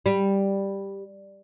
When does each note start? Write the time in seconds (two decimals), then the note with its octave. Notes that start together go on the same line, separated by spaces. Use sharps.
0.06 G3